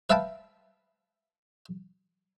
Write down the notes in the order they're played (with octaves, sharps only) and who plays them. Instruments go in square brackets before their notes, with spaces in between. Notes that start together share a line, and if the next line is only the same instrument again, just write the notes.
[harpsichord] B4 E5 F5 G5 A5 B5